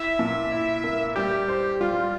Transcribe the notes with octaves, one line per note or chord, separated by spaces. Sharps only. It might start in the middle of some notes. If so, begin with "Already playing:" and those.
Already playing: E4 E5
A#2
E4
A#3
G3 G4
C5
G3 F4